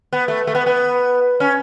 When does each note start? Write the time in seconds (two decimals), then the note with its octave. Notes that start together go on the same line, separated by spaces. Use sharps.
0.13 B3
0.28 A3
0.47 A3
0.55 B3
0.66 B3
1.40 C#4